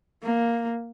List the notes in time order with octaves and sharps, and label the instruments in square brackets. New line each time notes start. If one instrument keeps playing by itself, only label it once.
[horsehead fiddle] A#3